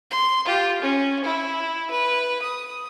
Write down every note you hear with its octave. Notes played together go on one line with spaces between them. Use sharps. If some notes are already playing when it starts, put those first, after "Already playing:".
C6
F4 G4
C#4
E4
B4
D#6